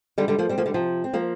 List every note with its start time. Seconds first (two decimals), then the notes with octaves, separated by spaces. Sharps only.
0.18 D3 G3
0.28 D3 G3
0.39 F3 A#3
0.49 G3 C4
0.58 F3 A#3
0.66 D3 G3
0.74 C3 F3
1.04 C4
1.13 F3 A#3